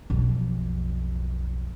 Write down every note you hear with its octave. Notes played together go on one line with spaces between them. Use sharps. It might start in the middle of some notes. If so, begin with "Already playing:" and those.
B1 F2